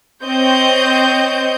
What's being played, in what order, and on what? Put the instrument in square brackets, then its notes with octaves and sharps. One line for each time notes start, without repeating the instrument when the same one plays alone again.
[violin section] C4 C#5 D#5 G6